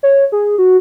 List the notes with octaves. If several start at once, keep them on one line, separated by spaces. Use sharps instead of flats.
C#5
G#4
F#4